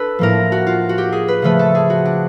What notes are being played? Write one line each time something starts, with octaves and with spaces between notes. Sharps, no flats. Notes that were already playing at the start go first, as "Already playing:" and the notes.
Already playing: D4 A4 B4
A2 F3 A#3 A#4
F#4
F4
F#4
G4
G#4
B4
C#3 F3 A3 B4
A4
G#4
F#4
D4